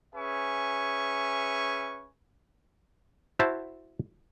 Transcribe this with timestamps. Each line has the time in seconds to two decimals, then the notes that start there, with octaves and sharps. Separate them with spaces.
0.14 C#4 G#4 B4 E5 G#5 C#6
3.39 E4 F#4 C5 E5 A5